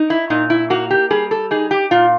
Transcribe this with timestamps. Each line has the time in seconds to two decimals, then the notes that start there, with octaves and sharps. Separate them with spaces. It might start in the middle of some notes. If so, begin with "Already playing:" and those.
Already playing: D#4
0.10 E4
0.30 A#2 D#4
0.50 E4
0.70 A#3 F#4
0.91 G4
1.10 G3 G#4
1.31 A4
1.51 D#4 G#4
1.71 G4
1.91 A#2 F4